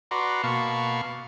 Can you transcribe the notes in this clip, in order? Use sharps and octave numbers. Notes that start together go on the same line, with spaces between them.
F#4 B4 D5 A#5 C6
B2 A#3 F5 A5 B5 C#6